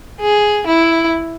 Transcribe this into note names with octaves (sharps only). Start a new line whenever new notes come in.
G#4
E4